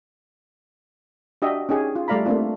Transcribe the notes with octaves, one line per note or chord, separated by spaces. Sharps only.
D4 F#4 G4 D#5 E5
C#4 D#4 G4 G#4
F4
G3 A3 D5 F5 A#5 B5
A3 A#3 C4 D4 F4